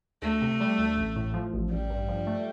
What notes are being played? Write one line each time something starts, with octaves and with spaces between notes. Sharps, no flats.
D2 A3
C3
G3
D2
A1
A2
F3
A1
A1 G3
G2
F3
A3